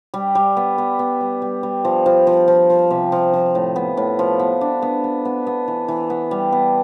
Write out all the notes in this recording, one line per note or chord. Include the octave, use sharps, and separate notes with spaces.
G3
G3
B3
B3
B3
G3
G3
G3
F3
F3
F3
F3
F3
C3
F3
F3
A2
B3
A2
F3
B3
D4
B3
B3
B3
B3
E3
E3
B3
G3
B3